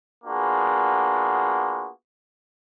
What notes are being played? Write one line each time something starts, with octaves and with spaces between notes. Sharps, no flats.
A#3 B3 D4 F4 F#4 G#4